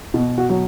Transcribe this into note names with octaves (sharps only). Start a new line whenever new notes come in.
B2
F#4
F#3